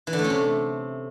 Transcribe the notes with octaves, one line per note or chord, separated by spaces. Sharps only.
E3
D3
A3
C#4
C3